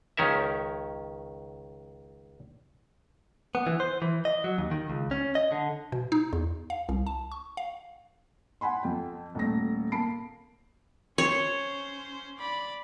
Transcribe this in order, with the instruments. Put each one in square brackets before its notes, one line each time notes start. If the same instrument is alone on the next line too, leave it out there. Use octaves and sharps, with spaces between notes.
[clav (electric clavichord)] C#2 D#3 C#4 A#4 E5
[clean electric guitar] B3
E3
C5
E3
D#5
F#3
D#2
D#3
C#2
C#4
D#5
D3
[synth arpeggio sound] B2
D#4
E2
F5
C2
A5
C#6
F5
[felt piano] F#5 G#5 B5 C6
F2 G5
D#1 A3 A#6
A#3 A5 B5 C7 D7
[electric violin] C#4 C5 [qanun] C#5
[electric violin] D5 B5